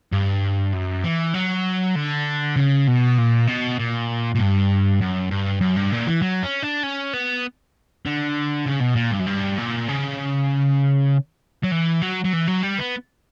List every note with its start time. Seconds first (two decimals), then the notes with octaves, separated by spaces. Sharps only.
0.13 G2
0.73 F#2
1.04 E3
1.34 F#3
1.96 D3
2.56 C#3
2.87 B2
3.18 A#2
3.47 B2
3.79 A#2
4.35 A#2
4.39 G2
5.01 F#2
5.31 G2
5.61 F#2
5.76 G2
5.92 A#2
6.07 E3
6.22 F#3
6.43 C#4
6.62 D4
6.83 C#4
7.14 B3
8.06 D3
8.66 C#3
8.81 B2
8.96 A#2
9.11 G2
9.20 F#2
9.27 G2
9.58 A#2
9.88 C#3
11.63 F#3
11.71 E3
12.02 F#3
12.24 F#3
12.33 E3
12.47 F#3
12.63 G3
12.79 B3